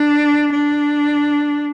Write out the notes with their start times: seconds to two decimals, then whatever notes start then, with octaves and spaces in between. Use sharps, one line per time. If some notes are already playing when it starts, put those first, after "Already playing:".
Already playing: D4
0.52 D4